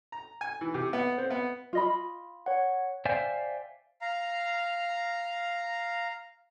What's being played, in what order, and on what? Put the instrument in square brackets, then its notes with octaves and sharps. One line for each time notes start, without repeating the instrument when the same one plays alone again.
[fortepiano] A#5
G#5
E3
C3
B3
C4
B3
[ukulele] F4 D#5 B5
[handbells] C#5 F#5
[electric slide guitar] C5 D5 E5 F5 G5 G#5
[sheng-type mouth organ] F5 A#5